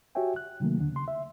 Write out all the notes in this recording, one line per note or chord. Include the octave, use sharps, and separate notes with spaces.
F#4 G4 C#5 E5 G5 G#5
F#6
C3 D#3 F#3 A3 A#3
D#2 D3
C#3 C6
E5